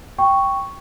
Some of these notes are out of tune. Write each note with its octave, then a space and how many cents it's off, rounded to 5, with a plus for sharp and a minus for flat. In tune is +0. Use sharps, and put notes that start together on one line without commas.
G5 +0 C#6 +0